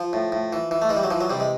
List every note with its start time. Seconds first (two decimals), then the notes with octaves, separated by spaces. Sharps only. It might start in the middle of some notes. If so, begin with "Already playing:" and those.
Already playing: F3
0.13 A2
0.32 A2
0.53 E3
0.71 E3
0.82 A3
0.89 E3 G#3
0.97 G3
1.03 F#3
1.10 E3 F3
1.21 F#3
1.30 C3 G3
1.40 G#3